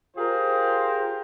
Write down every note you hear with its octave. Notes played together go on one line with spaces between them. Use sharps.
F4 G4 G#4 A#4 C5